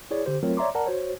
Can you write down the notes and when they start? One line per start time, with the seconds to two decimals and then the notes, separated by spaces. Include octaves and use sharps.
0.11 E4 G#4 C#5 D5
0.26 D3 G4 C5
0.43 F#3 A3 C4 F4 A#4 C#5
0.57 C#5 D5 E5 A#5 C6 D6
0.75 A#4 D5 F#5 A5 A#5
0.86 F#4 C5 C#5